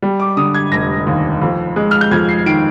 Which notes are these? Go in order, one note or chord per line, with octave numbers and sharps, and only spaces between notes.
G3
D6
D3 D#6
G#6
F1 A#6
D#2
F2
G#3
F6
G6
F2 G#6
C7
D#3 D7